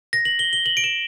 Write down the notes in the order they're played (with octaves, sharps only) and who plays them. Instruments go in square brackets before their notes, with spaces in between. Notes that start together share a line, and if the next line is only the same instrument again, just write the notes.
[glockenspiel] A#6
F#7
G7
G7
F#7
D7
E7